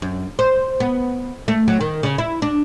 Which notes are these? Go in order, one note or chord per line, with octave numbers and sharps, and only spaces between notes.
F#2
C5
B3
A3
F#3
D#3
C#3
E4
D4